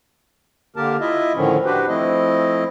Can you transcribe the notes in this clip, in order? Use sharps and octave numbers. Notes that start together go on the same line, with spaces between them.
D3 A#3 G4 A#4 A5
E4 F4 D#5 E5
A2 D3 D#3 F3 C#4
D4 F#4 G4 B4 C5
F3 A3 C4 E4 D#5